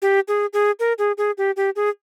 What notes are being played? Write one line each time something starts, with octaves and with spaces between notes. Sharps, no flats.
G4
G#4
G#4
A#4
G#4
G#4
G4
G4
G#4